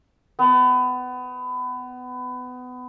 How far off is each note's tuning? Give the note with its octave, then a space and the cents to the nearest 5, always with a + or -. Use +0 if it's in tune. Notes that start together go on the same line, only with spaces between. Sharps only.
B3 +25